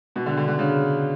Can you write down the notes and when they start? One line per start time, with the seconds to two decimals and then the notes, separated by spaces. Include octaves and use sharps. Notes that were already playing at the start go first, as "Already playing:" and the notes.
0.16 B2
0.26 D3
0.37 D3
0.48 D3
0.59 C#3